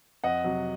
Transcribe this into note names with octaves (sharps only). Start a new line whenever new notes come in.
F2 D#5 F#5
C3 F#3